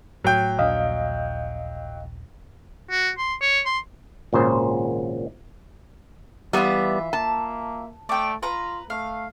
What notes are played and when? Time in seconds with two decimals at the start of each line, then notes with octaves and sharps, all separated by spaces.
0.24 A2 F#3 G5
0.59 D#1 A#1 D4 D#5 F5
2.91 F#4
3.18 C6
3.41 C#5
3.66 C6
4.33 G#1 A#2 C#3 C5
6.53 E3 G3 B3 F4 E5
7.13 A#3 A5
8.09 A3 D5 G5
8.43 F4 B4 A#5
8.90 A3 F5